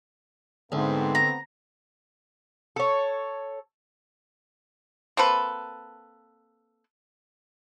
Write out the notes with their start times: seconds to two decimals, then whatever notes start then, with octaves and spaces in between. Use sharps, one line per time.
0.72 D2 G#2 A3 B3 C4
1.15 A#5
2.76 A4 C#5
5.17 A#3 C4 A4 B4